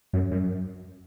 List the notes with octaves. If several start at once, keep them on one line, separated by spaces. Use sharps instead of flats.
F#2
F#2